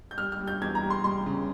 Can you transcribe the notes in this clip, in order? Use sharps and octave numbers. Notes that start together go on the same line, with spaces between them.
G6
G3 F6
F6
G3
G6
E2 G#6
A#5
G3
C6
G3 C6
C#3